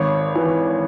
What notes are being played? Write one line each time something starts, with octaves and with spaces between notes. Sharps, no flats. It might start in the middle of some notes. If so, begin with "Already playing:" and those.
Already playing: G#1 C#5
E3